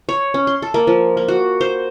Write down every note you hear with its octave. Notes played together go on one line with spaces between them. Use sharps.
C#5
C#4
C6
A4
A#3
F3
A#3
F#4
C5